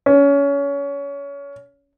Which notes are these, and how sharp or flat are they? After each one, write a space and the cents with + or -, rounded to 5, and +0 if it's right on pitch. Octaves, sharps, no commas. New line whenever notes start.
C#4 +25